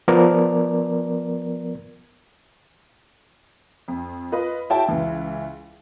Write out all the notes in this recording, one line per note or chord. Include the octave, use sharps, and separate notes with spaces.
F3 B3 A#4 D5
F2
F4 B4 D#5
E4 F#4 G#4 C#5 G5 A5
C#2 E3 E4